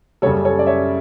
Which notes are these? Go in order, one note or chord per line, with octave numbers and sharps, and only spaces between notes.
F#2 C#3 G3 A4 C#5
A4 C#5
D5
C#5 E5